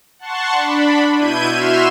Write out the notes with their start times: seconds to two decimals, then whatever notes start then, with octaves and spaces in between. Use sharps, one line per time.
0.19 F#5 A5 C6 C#6
0.52 D4 B5
1.16 B2 E4 G6 G#6 D#7
1.51 F#4 E5 C6 F6 E7